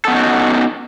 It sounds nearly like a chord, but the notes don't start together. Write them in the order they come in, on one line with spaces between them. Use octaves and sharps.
A4 B3 C#4 D#4 F#4